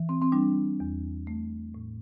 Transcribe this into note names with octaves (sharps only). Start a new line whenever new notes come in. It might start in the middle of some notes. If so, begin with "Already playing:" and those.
Already playing: E3
C4
C4
G3 D4
E2
A3
A2